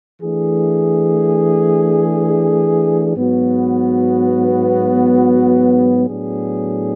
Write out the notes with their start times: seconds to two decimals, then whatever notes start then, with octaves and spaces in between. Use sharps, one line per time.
0.22 E3 A3 D4 G#4
3.15 G#2 F#3 B3 F#4
6.07 A2 F#3 B3 D4 G#4